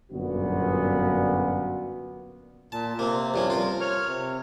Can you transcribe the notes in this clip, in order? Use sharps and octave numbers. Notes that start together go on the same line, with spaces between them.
G1 F#2 A#2 B3 F#4
A#2 A5
C3 A#3 C4
G2 F3 C#4
F4 A#4
C#5 F6
C3